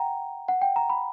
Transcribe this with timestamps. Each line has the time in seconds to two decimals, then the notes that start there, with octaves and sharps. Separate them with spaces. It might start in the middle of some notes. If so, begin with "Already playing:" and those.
Already playing: F#5 G5 A#5
0.48 F#5
0.62 G5
0.76 A#5
0.89 B5